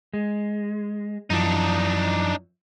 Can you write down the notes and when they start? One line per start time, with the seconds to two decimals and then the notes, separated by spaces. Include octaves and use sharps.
0.14 G#3
1.30 F#2 E3 F3 D4 D#4